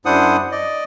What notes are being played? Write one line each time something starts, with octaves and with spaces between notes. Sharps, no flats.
F#2 D4 E4 C5 F#5 D#6
D5 D#5